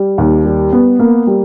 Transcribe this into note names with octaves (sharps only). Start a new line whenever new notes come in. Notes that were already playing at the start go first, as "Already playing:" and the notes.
Already playing: G3
D#2
G3
B3
A#3
G3